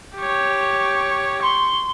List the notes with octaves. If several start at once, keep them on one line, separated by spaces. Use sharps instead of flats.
G4 C#5
C6 C#6